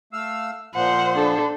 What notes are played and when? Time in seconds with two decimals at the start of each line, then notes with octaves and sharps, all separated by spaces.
0.13 A3 F5 E6
0.75 A#2 F3 C5 F#5
1.15 D4 A4